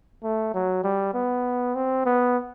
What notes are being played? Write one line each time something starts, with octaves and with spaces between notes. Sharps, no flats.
A3
F#3
G3
B3
C4
B3